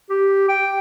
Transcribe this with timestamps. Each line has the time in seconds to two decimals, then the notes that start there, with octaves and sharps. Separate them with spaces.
0.10 G4
0.49 G5